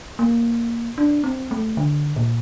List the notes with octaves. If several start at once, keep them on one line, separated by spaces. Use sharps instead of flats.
A#3
D4
C4
A3
D3
A#2